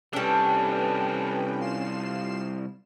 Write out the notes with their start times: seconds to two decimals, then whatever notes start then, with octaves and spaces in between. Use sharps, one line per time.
0.13 C2 G3 C#4 D4 A4 B4 G5
1.60 F4 C7 E7